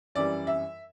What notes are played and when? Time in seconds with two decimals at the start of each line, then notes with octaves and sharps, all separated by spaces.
0.15 F#2 E3 G3 D5
0.47 E5